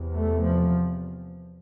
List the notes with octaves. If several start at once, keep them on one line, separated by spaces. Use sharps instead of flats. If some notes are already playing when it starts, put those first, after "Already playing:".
Already playing: E2 C3
A3
F3